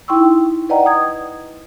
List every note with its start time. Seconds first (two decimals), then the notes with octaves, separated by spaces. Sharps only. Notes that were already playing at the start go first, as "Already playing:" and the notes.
0.08 D#4 E4 G5 C6 C#6 E6
0.69 B4 D5 D#5 F#5 G5 A#5
0.86 D#6 G#6